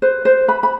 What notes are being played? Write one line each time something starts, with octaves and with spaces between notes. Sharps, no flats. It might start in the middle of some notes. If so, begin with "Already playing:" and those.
B4 C5
C5
B4 B5
B5